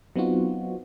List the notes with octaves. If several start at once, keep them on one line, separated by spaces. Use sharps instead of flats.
F#3 B3 C4 D#4 F4 F#4